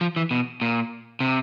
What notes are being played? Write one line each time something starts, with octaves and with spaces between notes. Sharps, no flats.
F3
E3
B2
A#2
C3